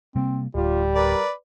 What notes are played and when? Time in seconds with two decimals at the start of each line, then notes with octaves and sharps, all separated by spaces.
0.16 C3 G3 A#3 C4
0.55 D1 G3 F4
0.95 A#4 B4 D5